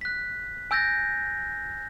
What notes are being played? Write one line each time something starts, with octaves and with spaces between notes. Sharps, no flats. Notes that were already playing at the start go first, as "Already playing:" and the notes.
F#6 B6
G#5 E6 G6 A6 A#6